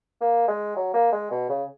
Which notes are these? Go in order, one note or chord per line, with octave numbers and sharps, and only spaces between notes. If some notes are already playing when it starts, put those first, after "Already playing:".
A#3
G#3
F#3
A#3
G#3
B2
C#3